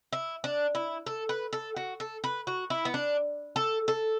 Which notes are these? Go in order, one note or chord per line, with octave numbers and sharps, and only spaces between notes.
E4
D4
E4
A4
B4
A4
F#4
A4
B4
F#4
E4
B3
D4
A4
A4